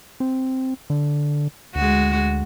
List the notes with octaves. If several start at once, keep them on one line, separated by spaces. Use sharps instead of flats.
C4
D3
D2 G#3 F#4